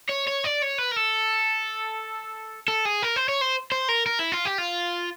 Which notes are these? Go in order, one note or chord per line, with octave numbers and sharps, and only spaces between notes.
C#5
C#5
D5
C#5
B4
A#4
A4
A4
G#4
A#4
C5
C#5
C5
C5
A#4
A#4
E4
F4
G4
F4